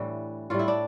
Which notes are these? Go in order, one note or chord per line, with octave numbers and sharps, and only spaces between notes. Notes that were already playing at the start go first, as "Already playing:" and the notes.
Already playing: A2 E3 G3 D4
A2 G3 F4
E4
D4